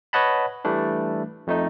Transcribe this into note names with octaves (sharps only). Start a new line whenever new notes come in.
B4 C#5 D#5 F#5 A5 B5
E3 G3 A3 D4
F2 A3 D#4